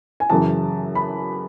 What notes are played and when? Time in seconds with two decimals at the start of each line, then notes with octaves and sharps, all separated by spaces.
0.20 G#5
0.30 F#2 C#3 E3 A5
0.95 B5